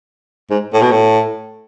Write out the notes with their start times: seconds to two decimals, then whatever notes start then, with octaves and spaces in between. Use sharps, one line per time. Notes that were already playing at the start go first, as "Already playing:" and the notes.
0.50 G#2
0.73 A2
0.82 B2
0.91 A2